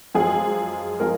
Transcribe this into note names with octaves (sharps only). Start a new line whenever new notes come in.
F#2 F3 G#3 G#4
F3 G#3 A#4